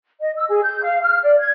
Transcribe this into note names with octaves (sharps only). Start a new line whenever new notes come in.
D#5
E6
G#4
G6
F5
F6
D5
G#6